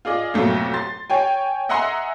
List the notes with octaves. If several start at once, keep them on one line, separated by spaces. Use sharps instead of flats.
F4 G#4 D5 D#5
F2 B2 F#3 A3 A#3
C6 A6
C#5 G5 G#5
D#5 E5 F#5 G#5 A#5 C6